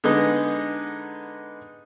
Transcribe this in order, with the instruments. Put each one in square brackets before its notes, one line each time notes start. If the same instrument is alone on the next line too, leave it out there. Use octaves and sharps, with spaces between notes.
[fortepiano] D3 G#3 B3 D#4